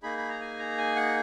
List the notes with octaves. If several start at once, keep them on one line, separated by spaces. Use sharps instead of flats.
A#3 D#4 G#4 B5
B5
A#5
G#5
A#5
G#5
F#5